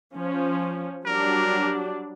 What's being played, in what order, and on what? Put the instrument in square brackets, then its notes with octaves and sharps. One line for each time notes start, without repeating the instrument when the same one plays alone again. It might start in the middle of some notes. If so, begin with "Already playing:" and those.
[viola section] F3 C#4
[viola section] F#3 G3 D4 [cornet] A#4